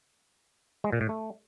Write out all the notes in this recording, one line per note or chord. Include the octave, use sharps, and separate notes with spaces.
G#3
A#2
A2
A3